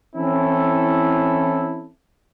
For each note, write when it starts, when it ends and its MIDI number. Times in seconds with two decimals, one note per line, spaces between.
0.16 1.89 52
0.16 1.89 60
0.16 1.89 61
0.16 1.89 64
0.16 1.89 69